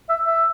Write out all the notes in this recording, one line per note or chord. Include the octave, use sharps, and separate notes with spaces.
E5
E5